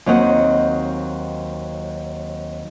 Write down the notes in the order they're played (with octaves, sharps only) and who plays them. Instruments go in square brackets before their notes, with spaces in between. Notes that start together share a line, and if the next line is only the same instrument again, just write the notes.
[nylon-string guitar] D#2 F#3 C4 D#4 D#5 F#5